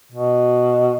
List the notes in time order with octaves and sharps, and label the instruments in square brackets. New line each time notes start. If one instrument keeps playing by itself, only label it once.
[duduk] B2